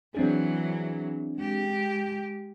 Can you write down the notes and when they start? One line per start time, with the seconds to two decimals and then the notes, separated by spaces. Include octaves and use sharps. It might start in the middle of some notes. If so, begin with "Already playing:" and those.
0.15 E3 F#3 C4 D4 G#4
1.38 G#3 G4